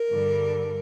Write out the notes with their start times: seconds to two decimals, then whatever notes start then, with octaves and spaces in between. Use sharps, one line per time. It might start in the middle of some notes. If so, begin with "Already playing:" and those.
Already playing: A#4
0.10 G2 D3 G3